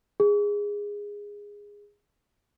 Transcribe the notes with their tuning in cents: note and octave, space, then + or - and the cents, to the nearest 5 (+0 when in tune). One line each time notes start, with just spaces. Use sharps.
G#4 -15